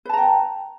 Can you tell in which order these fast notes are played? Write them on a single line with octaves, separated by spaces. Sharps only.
B4 A5 A#5 G5